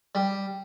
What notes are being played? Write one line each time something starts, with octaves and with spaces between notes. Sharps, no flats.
G3